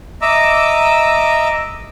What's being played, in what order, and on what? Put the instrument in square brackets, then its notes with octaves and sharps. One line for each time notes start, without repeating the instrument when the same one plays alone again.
[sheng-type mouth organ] D#5 E5 A#5 D6 E6